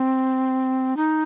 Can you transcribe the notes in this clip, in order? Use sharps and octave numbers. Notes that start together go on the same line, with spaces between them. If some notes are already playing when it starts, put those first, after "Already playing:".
Already playing: C4
D#4